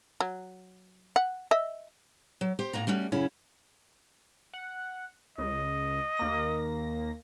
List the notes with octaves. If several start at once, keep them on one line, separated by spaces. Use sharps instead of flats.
F#3
F#5
D#5 E5
F#3
G4 C5
A2 A#3 F#4 A#5
G3 A3 C#4 F#4
F#2 C#3 C#4 E4
F#5
C#2 D#5
D#2 A#3 A#6